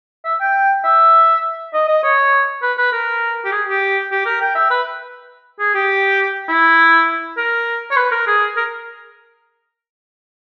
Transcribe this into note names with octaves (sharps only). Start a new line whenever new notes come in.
E5
G5
E5
D#5
D#5
C#5
B4
B4
A#4
G4
G#4
G4
G4
A#4
G5
E5
B4
G#4
G4
E4
A#4
C#5
B4
A#4
G#4
A#4